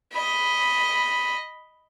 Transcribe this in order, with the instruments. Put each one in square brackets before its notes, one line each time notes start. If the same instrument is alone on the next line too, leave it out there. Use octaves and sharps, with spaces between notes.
[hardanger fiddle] D#5 B5